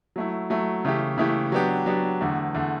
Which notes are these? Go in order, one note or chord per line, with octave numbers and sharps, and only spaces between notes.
F#3 A3 E4
F#3 A3 E4
C#3 E3 A3 E4 G4
C#3 E3 A3 E4 G4
F#3 B3 D4 G4
F#3 B3 D4 G4
E2 D3 A3
E2 D3 A3